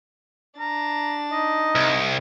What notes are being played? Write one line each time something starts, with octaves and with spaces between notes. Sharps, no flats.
D4 A#5 A6
D#4 D#5
C2